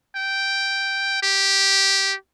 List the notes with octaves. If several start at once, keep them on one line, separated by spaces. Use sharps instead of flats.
G5
G4